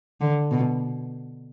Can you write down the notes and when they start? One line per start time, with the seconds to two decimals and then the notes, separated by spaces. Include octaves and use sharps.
0.21 D3
0.51 B2